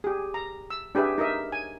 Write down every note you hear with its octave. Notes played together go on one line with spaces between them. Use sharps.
G4 G#4
A#5
E6
D4 G4 G#4 B4 E5
D#4 A#4 D#5 E5
G#5